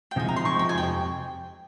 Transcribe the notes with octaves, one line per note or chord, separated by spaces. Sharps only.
G5
C3 F3 G#3 D#4 G#5
A#5
C6
C3 F3 G#3 D#4 C#6
G5
G#5
F2 C3 G5